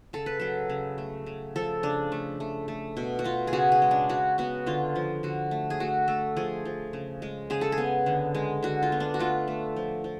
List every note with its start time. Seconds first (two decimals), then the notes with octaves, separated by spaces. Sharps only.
0.13 C#3 A4
0.26 B4
0.40 F#3 A4
0.70 C#3
0.98 A3
1.26 C#3
1.56 F3 A4
1.83 C#3 D4
2.12 A3
2.40 A3
2.68 A3
2.97 B2
3.19 F#4
3.24 B2 F4
3.47 G#4
3.53 C#3 F#4
3.72 G#4
3.82 G#3
3.91 D4
4.09 C#3 F#4
4.38 B3 F#4
4.66 D3 F4
4.96 F3
5.23 D3 F#4
5.51 A3
5.70 G#4
5.80 A3 F#4
6.08 A3 A4
6.36 F3 G#4
6.65 F3
6.93 C#3
7.22 G#3
7.50 C#3 G#4
7.61 A4
7.72 G#4
7.78 B3
8.06 D3
8.35 G#3
8.63 D3 F#4
8.83 F4
8.92 B3
9.00 D4
9.14 F#4
9.19 A3 F4
9.48 A3
9.76 F3
10.04 F3